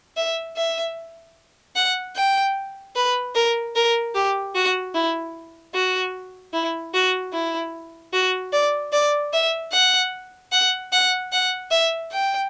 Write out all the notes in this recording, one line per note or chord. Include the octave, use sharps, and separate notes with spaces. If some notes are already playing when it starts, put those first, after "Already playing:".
E5
E5
F#5
G5
B4
A#4
A#4
G4
F#4
E4
F#4
E4
F#4
E4
F#4
D5
D5
E5
F#5
F#5
F#5
F#5
E5
G5